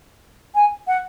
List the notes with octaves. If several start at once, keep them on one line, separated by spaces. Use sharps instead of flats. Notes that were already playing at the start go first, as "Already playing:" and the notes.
G#5
F#5